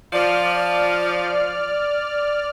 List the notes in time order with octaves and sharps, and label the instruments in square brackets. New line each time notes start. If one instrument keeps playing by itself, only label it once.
[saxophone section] F3 [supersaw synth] D5 F6